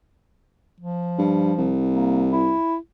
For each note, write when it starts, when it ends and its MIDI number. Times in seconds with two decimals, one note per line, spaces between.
0.80 1.74 53
1.19 1.53 43
1.58 2.55 36
1.91 2.23 58
2.32 2.76 64